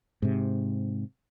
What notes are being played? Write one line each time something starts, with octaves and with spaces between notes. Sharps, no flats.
G#2 C3